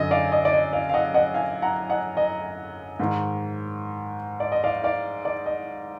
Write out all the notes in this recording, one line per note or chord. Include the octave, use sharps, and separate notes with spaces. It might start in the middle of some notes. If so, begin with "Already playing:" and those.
Already playing: F#2 D3 D#5
D5 F5
D#5
D5
D#5
D5 F5
F5
D#5 F#5
D#5 F#5
F5 G#5
F#5 A#5
D#5 F#5
D#5
G#2 D#3
D5
D#5
D5 F5
D5 F5
D5
D#5